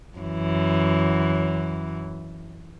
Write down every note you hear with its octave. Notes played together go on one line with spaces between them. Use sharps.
F#2 E3